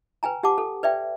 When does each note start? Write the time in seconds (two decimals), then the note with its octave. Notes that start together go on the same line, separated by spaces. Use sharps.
0.23 B4 G5 G#5 A#5
0.43 G4 F#5 A5 D6
0.58 A4
0.83 B4 D5 E5 G5